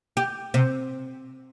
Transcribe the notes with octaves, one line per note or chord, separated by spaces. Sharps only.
G4
C3